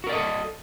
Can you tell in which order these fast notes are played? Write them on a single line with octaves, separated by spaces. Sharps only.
F#4 A#4 D5 D#5 A4